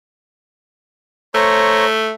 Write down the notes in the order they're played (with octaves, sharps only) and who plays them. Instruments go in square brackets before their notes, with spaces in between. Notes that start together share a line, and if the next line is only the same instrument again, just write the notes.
[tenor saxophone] A3 [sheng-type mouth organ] C5 C#5 A#5